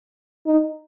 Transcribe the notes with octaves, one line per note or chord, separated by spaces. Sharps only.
D#4